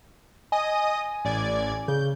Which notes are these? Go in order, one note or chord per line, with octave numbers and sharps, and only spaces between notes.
D#5 G#5 D#6
A1 D5 G#6
C#3 G6